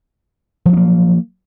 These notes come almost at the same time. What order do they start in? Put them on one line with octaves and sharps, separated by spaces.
F3 F#3 C#4 A#3